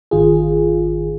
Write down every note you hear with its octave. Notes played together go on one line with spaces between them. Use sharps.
G#1 D#3 F4 G#4